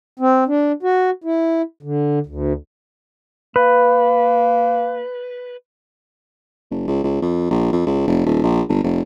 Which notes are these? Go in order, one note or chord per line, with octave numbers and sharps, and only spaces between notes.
C4
D4
F#4
E4
D3
D2
A#3 B4
F#1
C#2
C#2
F2
A#1
F2
C#2
F1
D#1
A#1
G1
F1